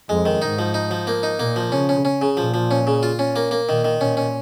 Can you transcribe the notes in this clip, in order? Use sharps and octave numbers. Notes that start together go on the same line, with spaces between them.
F2 G#3
D#3
G#2 D#4
F3
D#4
F3
A#3
D#4
A#2 A#3
F3
C#3 C#4
C#4
C#4
C#3
A#2 F3
F3
C#4
C#3
F4
C#4
A#3
A#3
A#2 D#3
D#3
A#2 C#4
C#4